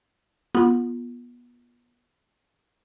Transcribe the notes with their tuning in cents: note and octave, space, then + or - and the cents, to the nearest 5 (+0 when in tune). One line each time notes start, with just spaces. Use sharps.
B3 -25 F4 +0